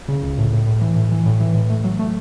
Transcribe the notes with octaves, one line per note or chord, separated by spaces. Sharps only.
C#3
C#2
A2
A2
A2
E3
A2
E3
A2
E3
A2
A3
F#3
A3